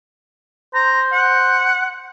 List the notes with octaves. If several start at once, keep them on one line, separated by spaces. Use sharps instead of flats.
C5 A#5
F#5